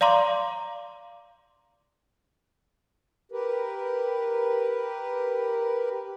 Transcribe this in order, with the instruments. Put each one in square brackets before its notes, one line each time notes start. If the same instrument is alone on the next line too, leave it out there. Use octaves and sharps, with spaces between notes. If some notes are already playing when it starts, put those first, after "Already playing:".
[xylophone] D5 F5 A#5 C6 D6
[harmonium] G4 A#4 B4